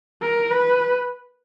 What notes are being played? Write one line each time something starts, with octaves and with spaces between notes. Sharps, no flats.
A#4
B4